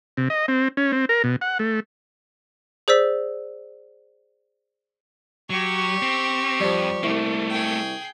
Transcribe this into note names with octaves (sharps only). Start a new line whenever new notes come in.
C3
D#5
C4
C#4
C4
A#4
B2
F#5
A3
G#4 C5 D5 E6 B6
F#3 G4 C#6
C4
F2 F3 G3
C2 A3 A#3
G#4 G5